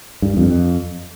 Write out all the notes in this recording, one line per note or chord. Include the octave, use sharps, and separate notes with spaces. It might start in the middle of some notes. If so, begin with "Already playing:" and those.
G2
F2